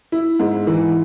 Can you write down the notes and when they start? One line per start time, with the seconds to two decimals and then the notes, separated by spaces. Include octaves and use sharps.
0.12 E4
0.40 G#2
0.67 E3